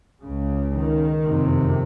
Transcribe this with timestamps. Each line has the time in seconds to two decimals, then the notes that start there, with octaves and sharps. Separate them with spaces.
0.22 C#2 C#3
0.72 D#3
1.23 F#1 F2 C3